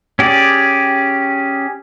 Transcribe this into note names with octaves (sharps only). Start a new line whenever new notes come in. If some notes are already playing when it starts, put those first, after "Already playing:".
C#4 G4 G#4 D5